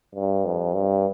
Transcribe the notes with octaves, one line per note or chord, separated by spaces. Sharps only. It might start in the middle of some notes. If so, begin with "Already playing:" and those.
G2
F2
G2